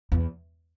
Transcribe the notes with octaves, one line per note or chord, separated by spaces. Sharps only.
E2